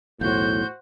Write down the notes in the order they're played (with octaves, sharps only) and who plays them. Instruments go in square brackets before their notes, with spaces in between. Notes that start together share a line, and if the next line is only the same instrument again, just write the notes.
[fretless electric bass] B1 E2 [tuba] A2 [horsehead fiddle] F#4 C5 [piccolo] G6